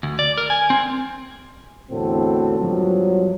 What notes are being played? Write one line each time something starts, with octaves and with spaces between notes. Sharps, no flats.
D2
D5
A#4
G#5
C4
E2 A2 D3 C4 F#4 A4
G2 B2 F3 F#3